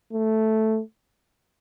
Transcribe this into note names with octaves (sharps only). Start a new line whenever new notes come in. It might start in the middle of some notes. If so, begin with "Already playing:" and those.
A3